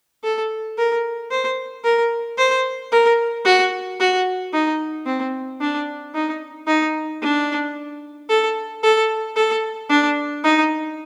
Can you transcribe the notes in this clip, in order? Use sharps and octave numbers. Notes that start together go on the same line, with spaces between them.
A4
A#4
C5
A#4
C5
A#4
F#4
F#4
D#4
C4
D4
D#4
D#4
D4
A4
A4
A4
D4
D#4